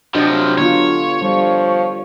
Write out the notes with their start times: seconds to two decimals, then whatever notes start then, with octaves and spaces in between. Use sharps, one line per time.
0.15 C3 F3 F#3 D4 G4 D#5
0.58 D3 B3 F4 C#5
1.22 F3 G3